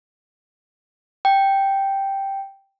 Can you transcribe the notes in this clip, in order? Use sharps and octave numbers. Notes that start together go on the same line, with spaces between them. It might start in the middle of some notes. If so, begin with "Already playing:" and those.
G5